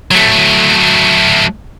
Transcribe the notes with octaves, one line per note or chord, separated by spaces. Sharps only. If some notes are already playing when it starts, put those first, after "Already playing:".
F#3 A3